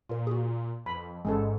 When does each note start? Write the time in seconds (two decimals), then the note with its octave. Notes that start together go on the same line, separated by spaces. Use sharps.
0.09 A#2 F4 A#4
0.27 F#4 G#4
0.86 F2 B5
1.25 A1 G#2 G#3 C#4 A4